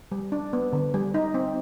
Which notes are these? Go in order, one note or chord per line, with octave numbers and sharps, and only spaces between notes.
G3
D4
B3
D3
G3
D#4
C4